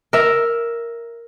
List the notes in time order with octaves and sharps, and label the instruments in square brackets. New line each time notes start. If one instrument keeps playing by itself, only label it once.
[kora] A#4 E5